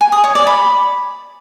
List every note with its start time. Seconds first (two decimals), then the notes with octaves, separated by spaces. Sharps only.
0.01 G#5
0.12 D#6
0.24 C#5
0.35 D5
0.47 B5